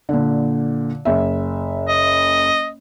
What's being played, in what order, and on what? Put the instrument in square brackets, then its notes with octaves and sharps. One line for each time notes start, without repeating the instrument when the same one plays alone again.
[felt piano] A#2 D3
F#1 E5
[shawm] D#5